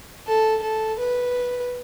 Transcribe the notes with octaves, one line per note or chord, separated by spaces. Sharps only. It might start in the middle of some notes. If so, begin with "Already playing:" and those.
A4
A4
B4